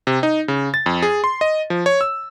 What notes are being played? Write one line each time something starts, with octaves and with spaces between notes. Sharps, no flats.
C3
D#4
C#3
A6
F2
G#4
C6
D#5
F3
C#5
E6